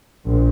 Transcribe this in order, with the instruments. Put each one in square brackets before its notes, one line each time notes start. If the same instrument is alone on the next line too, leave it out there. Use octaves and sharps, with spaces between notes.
[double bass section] A#1